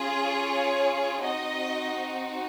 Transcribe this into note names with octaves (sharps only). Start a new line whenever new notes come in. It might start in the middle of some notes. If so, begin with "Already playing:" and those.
Already playing: C#4 F4 G#4
C#5
C4 D#4 F#4 D#5